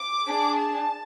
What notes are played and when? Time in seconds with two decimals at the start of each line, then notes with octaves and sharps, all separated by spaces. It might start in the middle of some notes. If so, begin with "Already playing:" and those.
Already playing: D6
0.25 D4 G#4
0.55 A5